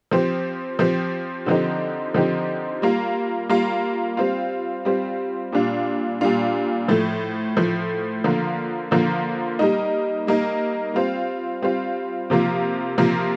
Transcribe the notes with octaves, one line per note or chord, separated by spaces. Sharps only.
F3 C4 G4
F3 C4 G4
D3 F3 C4 D#4 G4
D3 F3 C4 D#4 G4
G3 A#3 F4
G3 A#3 F4
G3 C4 F4
G3 C4 F4
A#2 G3 D4 F4
A#2 G3 D4 F4
A2 F3 A3
A2 F3 A3
D3 F3 A#3 F4
D3 F3 A#3 F4
G3 A#3 D#4
G3 A#3 D#4
G3 C4 F4
G3 C4 F4
C3 F3 A#3 F4
C3 F3 A#3 F4